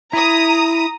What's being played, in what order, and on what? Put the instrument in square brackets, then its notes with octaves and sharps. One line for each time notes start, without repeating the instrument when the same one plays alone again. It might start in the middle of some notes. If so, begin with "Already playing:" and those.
[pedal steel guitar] E4 [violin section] A#5 D#6